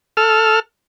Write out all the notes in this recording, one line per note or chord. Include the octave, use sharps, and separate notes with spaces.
A4 F6